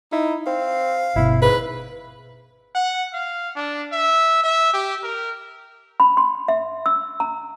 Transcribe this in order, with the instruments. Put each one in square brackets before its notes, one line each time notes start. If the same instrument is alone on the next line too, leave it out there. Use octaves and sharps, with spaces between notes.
[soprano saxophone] D#4 [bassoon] E4
[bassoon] C4 [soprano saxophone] F5
[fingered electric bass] G1 B2 [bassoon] E4
[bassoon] G#2 [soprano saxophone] B4
[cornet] F#5
F5
D4
E5
E5
G4
A#4
[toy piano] B5
C6
E5
E6
A#5